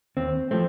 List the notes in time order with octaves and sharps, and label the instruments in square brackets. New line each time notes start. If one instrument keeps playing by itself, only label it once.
[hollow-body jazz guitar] D#2 C4
F3 A3 C4